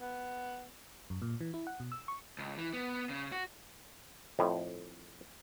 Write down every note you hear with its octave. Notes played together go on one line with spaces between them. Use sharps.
B3
F#2
A#2
E3
E4
F#5
B2
E6
C#6
C#2
E3
B3
C#3
F#4
F2 A2